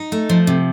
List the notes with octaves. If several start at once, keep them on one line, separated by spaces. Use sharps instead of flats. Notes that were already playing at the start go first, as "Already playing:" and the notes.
Already playing: D#4
A3
F3
C3